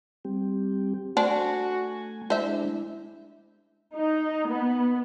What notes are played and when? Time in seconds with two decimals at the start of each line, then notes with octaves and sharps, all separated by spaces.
0.25 G3 C4 G4
1.17 A3 D4 F#4 C5 G#5
2.30 G#3 D4 E4 C5 E5
3.95 D#4
4.47 B3